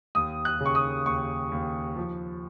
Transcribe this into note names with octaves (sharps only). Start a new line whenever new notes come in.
D#2 D#6
F#6
C#3
C#6
D#6
D#2 C#6
D#2
F3